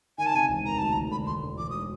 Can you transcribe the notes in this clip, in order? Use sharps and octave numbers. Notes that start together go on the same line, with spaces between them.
D#3 G#5
A5
C3 G#5
E1
D#3 A#5
D2 A5
A#5
E1
D3 B5
E1 C6
D3
E1 D6
D#6